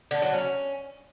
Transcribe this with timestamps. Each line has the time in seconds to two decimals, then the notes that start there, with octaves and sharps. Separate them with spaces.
0.11 D3
0.22 F#3
0.33 C#4